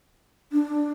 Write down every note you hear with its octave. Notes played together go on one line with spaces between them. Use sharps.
D4